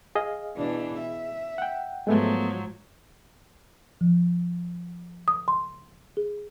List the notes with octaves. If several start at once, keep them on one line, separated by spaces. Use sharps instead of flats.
G#4 D#5 F5
B2 E3 D4
E5
F#5 G5
G#2 F3 F#3 G#3 A3 B3
F3
D#6
C6
G#4